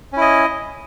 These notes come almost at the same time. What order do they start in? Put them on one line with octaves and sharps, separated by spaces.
C#4 E4 D#5